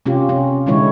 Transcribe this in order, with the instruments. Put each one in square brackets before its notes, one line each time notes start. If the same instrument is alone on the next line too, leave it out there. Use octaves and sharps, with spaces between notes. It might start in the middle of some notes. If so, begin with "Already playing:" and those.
[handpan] C3 C#4 F4 G4
C#4
A#2 D3 E3 G#3 E4 C#5